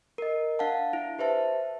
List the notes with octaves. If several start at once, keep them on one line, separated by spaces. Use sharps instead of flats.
A#4 D#5
D4 F5 F#5 A5
E4
G4 B4 C5 E5 A5